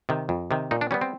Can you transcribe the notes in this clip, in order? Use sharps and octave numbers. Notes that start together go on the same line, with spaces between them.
C3 D#3
F2
C3 D#3
A#2 D#4
D4
G3 B3 C#4
C4